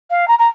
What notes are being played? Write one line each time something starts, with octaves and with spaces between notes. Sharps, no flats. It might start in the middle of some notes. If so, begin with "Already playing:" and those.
F5
A#5
A#5